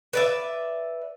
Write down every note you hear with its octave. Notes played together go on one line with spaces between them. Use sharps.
B4 D5 E5